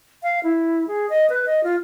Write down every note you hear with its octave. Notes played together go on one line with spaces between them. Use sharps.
F5
E4
G#4
D#5
B4
D#5
F4